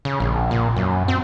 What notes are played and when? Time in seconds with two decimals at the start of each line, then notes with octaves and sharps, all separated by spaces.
0.05 C#3
0.20 A#1
0.51 A#2
0.76 F#2
1.08 C4